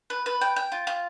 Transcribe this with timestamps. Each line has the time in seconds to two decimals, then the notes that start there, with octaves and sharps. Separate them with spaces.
0.10 B4
0.26 B4
0.41 G5
0.56 G5
0.72 F4
0.87 F4